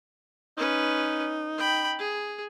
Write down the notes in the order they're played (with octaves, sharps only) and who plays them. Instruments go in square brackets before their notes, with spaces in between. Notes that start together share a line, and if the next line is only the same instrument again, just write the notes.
[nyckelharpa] C#4 B4 [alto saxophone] D#4
[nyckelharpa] G5 B5
G#4